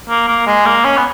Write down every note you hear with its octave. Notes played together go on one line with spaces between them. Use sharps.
A#3
A#3
G#3
A#3
C#4
B3